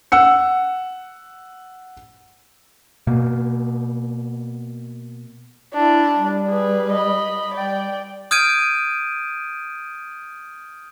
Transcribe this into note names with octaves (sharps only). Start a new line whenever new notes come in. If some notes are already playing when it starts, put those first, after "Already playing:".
F#5 E6 C#7
B2 A#3
D4 E4
G3
G#4 B4
D#5 B5
G3 D5 G5
D#6 F6 G6 G#6 D7 D#7